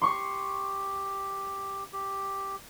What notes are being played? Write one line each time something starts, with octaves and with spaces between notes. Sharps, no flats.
G4 C6 C#6
G4